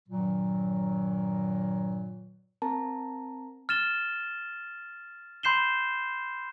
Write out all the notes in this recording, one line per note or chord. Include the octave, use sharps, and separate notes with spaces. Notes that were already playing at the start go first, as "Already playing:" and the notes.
G2 A#2 D#3 F#3
C4 A#4 A5 A#5
F6 A6 E7 G7
B5 C6 G6 C7 E7 G7